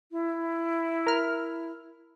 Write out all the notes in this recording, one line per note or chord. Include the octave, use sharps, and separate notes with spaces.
E4
A#4 F6